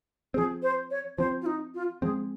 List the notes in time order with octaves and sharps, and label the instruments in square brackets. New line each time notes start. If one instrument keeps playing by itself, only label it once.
[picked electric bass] F3 C4 [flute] G#4
[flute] C5
C#5
[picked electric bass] F3 C4 [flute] C5
[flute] F4
D#4
F4
[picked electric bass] F3 G#3 C4 [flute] G#4